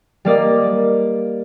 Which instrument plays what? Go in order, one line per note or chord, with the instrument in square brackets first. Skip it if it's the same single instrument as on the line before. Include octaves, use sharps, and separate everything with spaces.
[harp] G3 A#3 D5 D#5